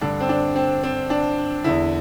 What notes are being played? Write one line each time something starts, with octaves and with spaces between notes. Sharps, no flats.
G2 D3 D4
C4
D4
C4
C4
D4
E2 D3 E4